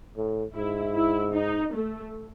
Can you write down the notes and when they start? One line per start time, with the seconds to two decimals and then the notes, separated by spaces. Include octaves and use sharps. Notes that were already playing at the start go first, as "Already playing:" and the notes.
0.17 A2
0.56 G#2 E4
0.95 E4
1.34 D#4
1.74 A3